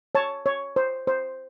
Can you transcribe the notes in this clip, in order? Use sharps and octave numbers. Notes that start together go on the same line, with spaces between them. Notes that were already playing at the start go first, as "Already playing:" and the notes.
C#5 A5
C#5
C5
C5